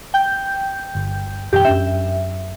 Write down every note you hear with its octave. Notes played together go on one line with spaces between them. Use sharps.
G5 G6
G1
F#2 B2 E3 G4 G5
F#2 C#4 D4 E5